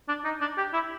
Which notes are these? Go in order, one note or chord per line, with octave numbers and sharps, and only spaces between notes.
D4
D#4
D4
G4
E4